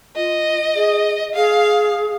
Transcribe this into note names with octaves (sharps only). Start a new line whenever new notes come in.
F4 D#5
G#4
G#4 F5